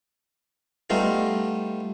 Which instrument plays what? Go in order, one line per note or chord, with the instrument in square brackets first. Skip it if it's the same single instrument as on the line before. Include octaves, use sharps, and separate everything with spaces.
[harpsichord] G3 A3 B3 D#4 F4